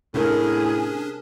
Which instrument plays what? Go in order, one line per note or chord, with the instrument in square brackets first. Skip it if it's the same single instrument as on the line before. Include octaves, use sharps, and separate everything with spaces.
[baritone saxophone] A2 [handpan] C3 A#4 [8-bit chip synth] C#4 D4 [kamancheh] G#4